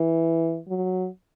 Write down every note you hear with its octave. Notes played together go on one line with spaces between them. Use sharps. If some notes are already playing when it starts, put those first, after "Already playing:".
Already playing: E3
F#3